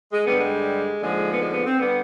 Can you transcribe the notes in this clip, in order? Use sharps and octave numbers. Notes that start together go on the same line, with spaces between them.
G#3
G2 D3 G3 B3
G#3
D#2 D3 F3 G#3
B3
G#3
B3
C4
D3 G3 B3